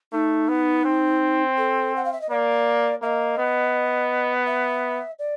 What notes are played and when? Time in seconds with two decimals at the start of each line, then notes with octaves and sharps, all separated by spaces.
0.12 A3 D#4
0.48 B3
0.85 C4
1.57 A4
1.96 F#5
2.04 F5
2.12 E5
2.21 D#5
2.30 A#3 D5
3.02 A#3 E5
3.05 D#5
3.38 B3
4.46 E5
5.19 D5